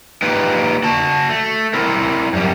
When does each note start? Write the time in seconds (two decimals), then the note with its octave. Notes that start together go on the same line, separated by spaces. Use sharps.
0.22 A#3 D#4 F4 G4 B4 G5
0.83 F#4 A5
1.29 A3
1.74 C4 E4 A#4
2.33 F#2 G3